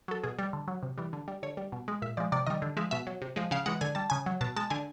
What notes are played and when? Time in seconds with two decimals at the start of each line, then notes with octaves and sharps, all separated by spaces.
0.08 F#3 A4
0.24 B2 G#4
0.39 G3
0.53 D3
0.68 F#3
0.83 C3
0.98 E3 G3
1.13 D3
1.28 G3
1.43 D3 C#5
1.57 G3
1.72 B2
1.88 G#3
2.02 A#2 E5
2.17 F3 G#3 D5
2.32 C3 D5
2.46 D#3 G3 D#5
2.62 D3
2.77 F3 G#3 E5
2.91 B2 E5
3.07 F#3
3.22 C3
3.36 F3 G#3
3.51 C#3 F5
3.66 E3 G#3 F#5
3.81 D3 G#5
3.95 G3 A5
4.10 C#3 G#5
4.26 F#3
4.41 B2 A5
4.56 G#3 A5
4.70 D3 G#5